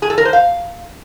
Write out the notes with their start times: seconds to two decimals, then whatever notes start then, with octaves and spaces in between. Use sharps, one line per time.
0.02 G#4
0.10 A4
0.18 A#4
0.25 C5
0.33 F5